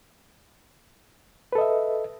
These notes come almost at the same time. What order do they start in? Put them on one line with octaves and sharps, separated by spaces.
B4 A4 D#5 E5